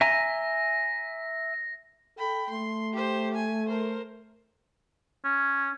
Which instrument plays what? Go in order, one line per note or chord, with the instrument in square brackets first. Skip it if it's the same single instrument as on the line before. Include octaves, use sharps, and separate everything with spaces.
[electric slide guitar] E5 G#5 A#5 [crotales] A#6
[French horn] A4 [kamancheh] G5 B5
[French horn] A3 [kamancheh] C6
[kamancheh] G4 C5
G#5
A#4 C5
[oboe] C#4